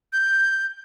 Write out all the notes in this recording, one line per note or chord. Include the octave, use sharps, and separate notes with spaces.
G6